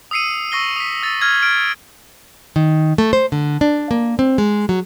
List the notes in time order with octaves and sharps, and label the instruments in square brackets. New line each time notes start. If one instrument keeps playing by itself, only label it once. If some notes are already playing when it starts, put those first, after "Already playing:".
[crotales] D#6 E6 C7 C#7 D#7
C#6 E6 A#6 C7 G7
D#6 B6
E6 A6
E6 F6 G#6
F6 D7
[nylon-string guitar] D#3
A3
C5
D3
D4
A#3
C4
G#3
F#3